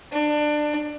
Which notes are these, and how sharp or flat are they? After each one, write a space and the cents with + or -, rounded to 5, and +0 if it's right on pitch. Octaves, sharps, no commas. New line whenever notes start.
D4 +20